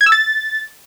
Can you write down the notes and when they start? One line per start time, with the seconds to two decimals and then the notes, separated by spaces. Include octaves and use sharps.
0.01 G#6
0.06 E6
0.12 A6